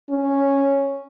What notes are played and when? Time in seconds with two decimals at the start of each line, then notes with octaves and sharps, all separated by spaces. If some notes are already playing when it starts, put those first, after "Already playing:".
0.10 C#4